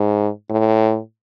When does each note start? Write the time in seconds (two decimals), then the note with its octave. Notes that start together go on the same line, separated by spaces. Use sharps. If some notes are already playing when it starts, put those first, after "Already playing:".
Already playing: G#2
0.50 A2